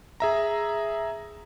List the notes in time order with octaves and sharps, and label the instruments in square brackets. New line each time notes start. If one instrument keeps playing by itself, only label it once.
[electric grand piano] G#4 E5 A#5